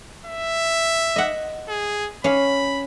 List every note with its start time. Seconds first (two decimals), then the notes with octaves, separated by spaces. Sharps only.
0.26 E5
1.16 D#5 F#5
1.68 G#4
2.24 C#4 F5 B5